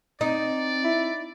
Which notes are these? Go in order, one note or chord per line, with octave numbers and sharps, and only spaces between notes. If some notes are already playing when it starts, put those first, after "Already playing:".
C4 D#4 D5
E4